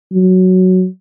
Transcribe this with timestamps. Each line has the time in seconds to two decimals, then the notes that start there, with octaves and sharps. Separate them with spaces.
0.13 F#3